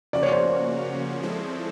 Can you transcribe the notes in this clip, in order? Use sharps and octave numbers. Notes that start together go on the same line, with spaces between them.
C#3 F3 A#3 C#4 F#4 D5
C#5
C5 D5
F3 G#3 C4 E4 A4